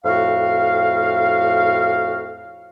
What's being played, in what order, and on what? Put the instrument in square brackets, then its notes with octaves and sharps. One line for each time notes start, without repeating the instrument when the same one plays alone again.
[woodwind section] F2 A2 F#4 F5